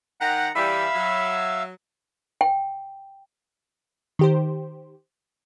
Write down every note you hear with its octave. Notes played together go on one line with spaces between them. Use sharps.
D#3 F#5 G5 A#5 F#6
E3 G3 E5 F5 B5 E6
F#3
G5
D#3 G4 C5